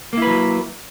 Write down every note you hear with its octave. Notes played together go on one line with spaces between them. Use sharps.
F#3 A#3 E4 B4